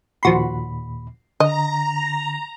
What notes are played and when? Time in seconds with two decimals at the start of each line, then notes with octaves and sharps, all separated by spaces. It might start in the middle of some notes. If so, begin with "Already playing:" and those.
0.23 D#2 A#2 F3 F#4 B5 C6
1.40 D3 D#5 A#5